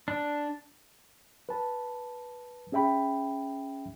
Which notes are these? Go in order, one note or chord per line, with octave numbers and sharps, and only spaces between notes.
D4
B4 A5
C#4 G#4 E5 G5 B5